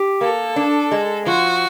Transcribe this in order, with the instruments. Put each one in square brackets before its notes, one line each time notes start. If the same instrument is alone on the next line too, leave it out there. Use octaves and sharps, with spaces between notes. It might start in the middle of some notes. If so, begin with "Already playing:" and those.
Already playing: [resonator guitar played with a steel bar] G4
[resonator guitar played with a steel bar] A#3 [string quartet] A4
[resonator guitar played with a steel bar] D4
G#3
[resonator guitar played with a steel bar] F3 [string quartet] F#4